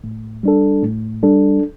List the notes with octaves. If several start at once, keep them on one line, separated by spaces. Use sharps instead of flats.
A2
G3 D4 A4
A2
G3 D4 A4